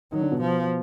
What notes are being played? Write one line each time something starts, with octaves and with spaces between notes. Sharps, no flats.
D#3 F#3 D#4
D3 D4
B2 B3
F3